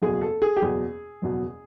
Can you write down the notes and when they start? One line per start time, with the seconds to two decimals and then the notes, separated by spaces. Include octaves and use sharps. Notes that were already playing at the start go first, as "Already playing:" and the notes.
0.02 F#1 E2 B2 G#4
0.21 A4
0.42 G#4
0.57 G4
0.61 F#1 E2 B2 G#4
1.22 F#1 E2 B2